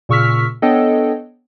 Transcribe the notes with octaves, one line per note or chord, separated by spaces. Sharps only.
A#2 C#3 C#6 E6 F6 B6
B3 D4 A4 C#5 D#5 G5